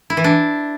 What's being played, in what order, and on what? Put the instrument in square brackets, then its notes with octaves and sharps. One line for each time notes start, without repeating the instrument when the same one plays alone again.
[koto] E4
E3
D4